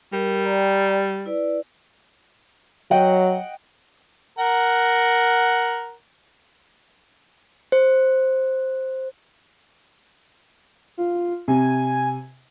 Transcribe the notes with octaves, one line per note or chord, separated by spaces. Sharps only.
G3 A#4
D5 G5 A#5
E4 B4 D5
F#3 D#5 F#5 G5
A#4 F#5
C5
F4
C3 G#5